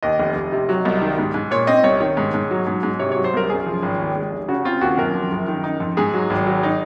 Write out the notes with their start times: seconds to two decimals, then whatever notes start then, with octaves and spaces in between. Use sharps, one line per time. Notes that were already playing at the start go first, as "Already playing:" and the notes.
0.03 D#2 D#5
0.20 F1
0.36 F1
0.52 C3
0.69 F#3
0.85 C2
1.01 D#3
1.18 G#2
1.34 G#2
1.51 A#2 C#5
1.67 C4 D#5
1.84 C2 C#5
2.01 D#3 C#5
2.17 G#2
2.34 G#2
2.51 F#3
2.67 G#2
2.83 G#2
2.99 C3 C#5
3.12 F#3 C#5
3.24 C5
3.33 C2 A#4
3.49 F#2 G#4
3.66 F3
3.82 G#1
3.99 D#2
4.16 G#3
4.32 F1
4.48 C#3 F#4
4.65 C4 F4
4.81 D#2 F#4
4.98 F#2 A#4
5.14 F3
5.31 F#1
5.48 D#3
5.64 D#4
5.80 F2
5.97 G#2 G#4
6.14 F#3
6.30 G#1
6.47 F#3
6.63 D#4